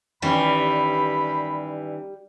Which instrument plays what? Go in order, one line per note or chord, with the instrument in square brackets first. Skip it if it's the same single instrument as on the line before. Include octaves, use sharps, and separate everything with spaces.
[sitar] G2 E3 [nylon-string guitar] D#3 C#4 [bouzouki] G3 [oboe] B5